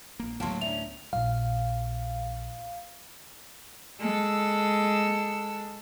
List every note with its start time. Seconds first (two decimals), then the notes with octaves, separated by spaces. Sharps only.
0.20 A#1 A#3
0.40 D2 A2 F#3 A#3 B3 A5 C6
0.61 C#4 D4 D5 E5 F7
1.13 A#1 F5
4.00 G#3 A4 E6